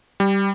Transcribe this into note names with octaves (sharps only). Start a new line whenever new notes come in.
G3